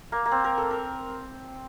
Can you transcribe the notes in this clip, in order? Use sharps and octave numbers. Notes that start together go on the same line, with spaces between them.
A#3
A#3
C4
A#4
A4
A#4